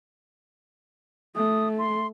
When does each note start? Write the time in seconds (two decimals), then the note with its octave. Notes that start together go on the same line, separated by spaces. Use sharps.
1.36 A3 D#6
1.78 C6